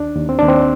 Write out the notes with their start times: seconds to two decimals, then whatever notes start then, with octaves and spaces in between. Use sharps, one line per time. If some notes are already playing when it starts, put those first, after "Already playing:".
Already playing: D#2 D4
0.16 D#2
0.29 C4
0.39 D#2 D4
0.48 C4